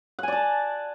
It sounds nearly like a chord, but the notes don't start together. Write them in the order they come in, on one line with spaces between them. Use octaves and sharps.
F#5 G#5 D5 A5